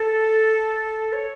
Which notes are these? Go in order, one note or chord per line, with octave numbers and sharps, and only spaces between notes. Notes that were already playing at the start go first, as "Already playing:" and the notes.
Already playing: A4
C#5